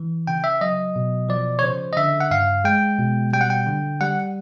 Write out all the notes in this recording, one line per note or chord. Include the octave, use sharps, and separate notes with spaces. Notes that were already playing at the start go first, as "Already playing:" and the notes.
Already playing: E3
C#3 G5
E5
F#3 D#5
B2
F3 D5
C#5
C#3 C5
D#5
D3 E5
F#5
G2 F5
G#3 G5
B2
G3 G5
F#5
G5
D3
G3 F#5